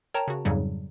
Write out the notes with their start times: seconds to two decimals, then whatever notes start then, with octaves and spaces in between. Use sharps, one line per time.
0.14 A#4 C#5 G5 A5 A#5
0.28 C#3 F#4
0.45 F2 G#2 C#3 F#3 G3